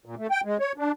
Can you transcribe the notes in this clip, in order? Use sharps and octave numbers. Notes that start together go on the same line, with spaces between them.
A#2
A3
G5
G#3
C#5
D4